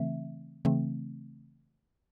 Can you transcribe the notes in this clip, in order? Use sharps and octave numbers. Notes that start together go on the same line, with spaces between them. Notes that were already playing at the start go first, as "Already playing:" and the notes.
Already playing: C#3 E3 A3 C4 E5
C#3 E3 A3 C4